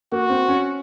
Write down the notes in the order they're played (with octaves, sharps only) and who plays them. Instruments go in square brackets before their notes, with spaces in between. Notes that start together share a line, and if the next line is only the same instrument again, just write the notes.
[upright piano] A#3 [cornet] F#4
[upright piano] C4
C#4